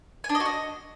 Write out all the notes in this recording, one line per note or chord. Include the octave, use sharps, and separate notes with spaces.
G#5
D4
D#5
F#4
D#5